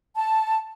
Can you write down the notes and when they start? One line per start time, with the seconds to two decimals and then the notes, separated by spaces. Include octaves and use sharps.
0.15 A5